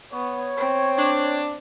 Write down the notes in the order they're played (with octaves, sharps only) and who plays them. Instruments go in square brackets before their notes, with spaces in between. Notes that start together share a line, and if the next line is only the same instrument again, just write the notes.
[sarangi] B3 [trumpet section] C#5
[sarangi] C4
[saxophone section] D4